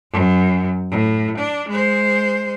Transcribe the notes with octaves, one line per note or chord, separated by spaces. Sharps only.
F#2
A2
D4
G#3 C5